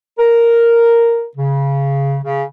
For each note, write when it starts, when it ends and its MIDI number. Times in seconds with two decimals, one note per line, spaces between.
0.19 1.26 70
1.36 2.18 49
2.24 2.44 49